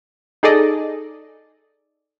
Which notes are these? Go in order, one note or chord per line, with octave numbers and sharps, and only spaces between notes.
D#4 G#4 A4 D5 D#5